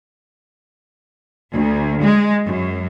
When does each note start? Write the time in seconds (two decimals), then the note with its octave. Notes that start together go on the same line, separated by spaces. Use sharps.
1.53 D2
2.02 G#3
2.45 F#2